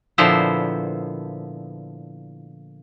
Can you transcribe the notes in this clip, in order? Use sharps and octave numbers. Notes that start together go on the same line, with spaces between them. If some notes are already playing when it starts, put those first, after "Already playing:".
A#2 D3 F3 B3 E4 C5